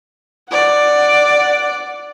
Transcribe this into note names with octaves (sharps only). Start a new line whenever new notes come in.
D5 F#5